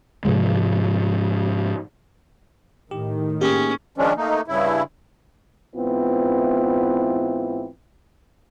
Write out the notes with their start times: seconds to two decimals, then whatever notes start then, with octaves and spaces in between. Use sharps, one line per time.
0.25 G#2 C3 F3 G#3
2.91 A2 D#3 G4
3.41 A#3 C#4 G4 G#4
3.98 D#3 F3 G#3 C#4 D4
4.17 A3 A#3 D#4
4.48 G2 C#3 E4
5.76 G#2 E3 B3 C4 E4 F4